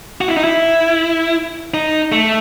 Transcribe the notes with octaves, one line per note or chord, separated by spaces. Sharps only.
F#4
E4
D#4
E4
D#4
A3